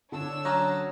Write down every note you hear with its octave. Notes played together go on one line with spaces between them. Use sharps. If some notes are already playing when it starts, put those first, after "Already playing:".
D3 D4 C#5 A5 E6
F#3 C#4 A#5 D#6